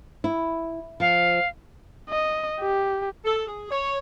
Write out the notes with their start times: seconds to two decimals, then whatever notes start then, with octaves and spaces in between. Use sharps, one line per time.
0.24 E4
1.00 F3 F5
2.10 D#5
2.60 G4
3.25 A4
3.47 G#4
3.70 C#5